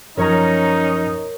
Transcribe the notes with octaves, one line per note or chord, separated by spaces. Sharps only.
F#2 F3 C#4 D#4 A#4 C#5 A#5